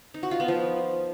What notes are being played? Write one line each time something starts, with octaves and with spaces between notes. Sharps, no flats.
D#4
F#4
F4
B3
F3